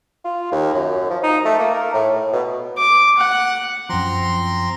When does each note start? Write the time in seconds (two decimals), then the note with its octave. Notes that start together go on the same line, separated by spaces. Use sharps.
0.25 F4
0.52 D#2
0.74 F#2
1.10 F3
1.23 D#4
1.45 A3
1.59 A#3
1.74 A#4
1.94 A2
2.15 A2
2.33 B2
2.77 D6
3.18 F#5
3.90 F#2 F3 C4 A#5 C6